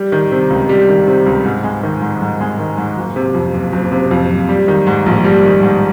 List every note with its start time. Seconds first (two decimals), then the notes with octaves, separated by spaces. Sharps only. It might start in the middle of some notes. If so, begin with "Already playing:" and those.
Already playing: G3
0.12 D#3
0.32 C3
0.50 C#2
0.69 G3
0.89 D#3
1.07 C3
1.26 C#2
1.45 G#2
1.64 G#3
1.83 D#3
2.02 G#2
2.21 G#2
2.41 G#3
2.59 D#3
2.77 G#2
2.96 F#1
3.16 C3
3.34 F2
3.54 F#1
3.72 F#1
3.92 C3
4.11 F2
4.30 F#1
4.49 G3
4.68 D#3
4.87 G#2
5.06 A#1
5.24 G3
5.44 D#3
5.62 G#2